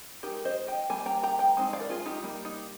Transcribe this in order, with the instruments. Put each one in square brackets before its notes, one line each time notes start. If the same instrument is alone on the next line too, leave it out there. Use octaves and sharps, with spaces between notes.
[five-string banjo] G#3 D#4 G4 A#4
C5 D#5
D#5 G5
G3 A#3 G#5
G5 A#5
G5 A#5
G5 A#5
G#3 C4 D#4
D5 F5
A#4
F4 G#4
D#4 G4
G3 A#3 D#4
D#4